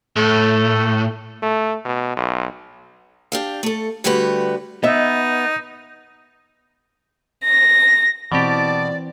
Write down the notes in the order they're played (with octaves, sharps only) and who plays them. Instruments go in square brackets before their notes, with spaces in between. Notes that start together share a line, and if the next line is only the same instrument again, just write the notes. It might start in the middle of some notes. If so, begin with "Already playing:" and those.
[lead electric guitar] A2 [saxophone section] A3 A4
[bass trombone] A3
B2
B1
[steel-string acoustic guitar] D4 G4 F5
A3 A4
D3 G3 A3 F#4 G4 B4
[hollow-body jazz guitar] B3 E5 [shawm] D#4 [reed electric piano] D#5
[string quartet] A#6
[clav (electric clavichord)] B2 G4 [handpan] E3 C4 [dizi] D5 [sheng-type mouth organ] A5 D6